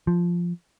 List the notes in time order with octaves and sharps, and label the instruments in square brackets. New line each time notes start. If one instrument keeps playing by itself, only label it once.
[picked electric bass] F3